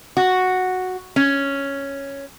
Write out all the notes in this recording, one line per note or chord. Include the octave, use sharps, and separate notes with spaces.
F#4
C#4